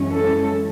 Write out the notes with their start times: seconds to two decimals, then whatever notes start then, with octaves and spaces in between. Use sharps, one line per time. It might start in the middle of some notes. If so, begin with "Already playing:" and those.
Already playing: F#2 E3 G#3 C#4
0.12 A4